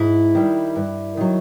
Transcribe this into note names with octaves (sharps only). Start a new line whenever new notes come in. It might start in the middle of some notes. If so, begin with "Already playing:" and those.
Already playing: G#2 E4
D#3 G3
G2
D#3 F#3